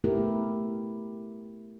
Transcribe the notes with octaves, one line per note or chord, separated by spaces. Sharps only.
A3 B3 E4 G4 A#4